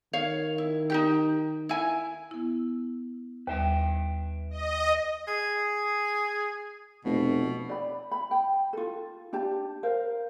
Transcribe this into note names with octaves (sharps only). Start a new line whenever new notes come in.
D#3 C#5 F5
E4
D#4 G4 G5
E4 G#5
B3 E4
D#2 G3 B4 E5 G5
D#5
G#4
F1 B2
D5 B5
B5
G5
F4 A4
D4 G4 A5
A#4 C5 F5